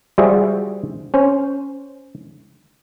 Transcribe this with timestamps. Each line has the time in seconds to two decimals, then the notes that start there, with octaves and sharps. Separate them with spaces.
0.18 G3 F4 F#4 G#4 C5 E5
1.14 C#4 C5